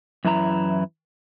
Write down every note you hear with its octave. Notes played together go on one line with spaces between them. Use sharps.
F#2 E3 E4 A#5